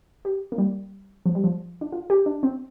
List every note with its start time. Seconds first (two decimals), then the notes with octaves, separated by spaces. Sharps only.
0.25 G4
0.52 A#3
0.58 G3
1.26 F3
1.35 G3
1.44 F3
1.81 D4
1.92 F4
2.10 G4
2.26 D4
2.43 C4